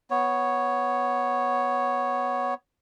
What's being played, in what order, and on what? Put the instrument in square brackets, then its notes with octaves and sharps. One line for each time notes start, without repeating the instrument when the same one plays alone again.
[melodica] B3 C#5